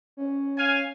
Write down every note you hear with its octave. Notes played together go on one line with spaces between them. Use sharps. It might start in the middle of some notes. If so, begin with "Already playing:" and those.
C#4
F5 G#5